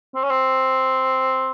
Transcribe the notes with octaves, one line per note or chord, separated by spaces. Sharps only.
C4
C#4
C4